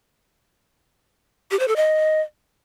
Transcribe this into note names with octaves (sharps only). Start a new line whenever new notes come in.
G4
C5
A4
D#5